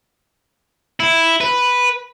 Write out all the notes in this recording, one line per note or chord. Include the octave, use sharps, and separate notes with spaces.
E4
B4